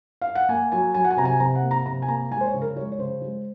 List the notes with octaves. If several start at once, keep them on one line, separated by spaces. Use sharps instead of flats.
F5
F#5
A#3 G#5
F#3 G#5
F#3 G#5
F#5
G#5
C3 A#5
G#5
C3 A#5
F#5
A#3
A#5
C3 A#5
G#5
A#3 A#5
G#3 G#5
C5
C#5
C#3
A#4
G#3 C#5
C#5
C#3 C5
G#3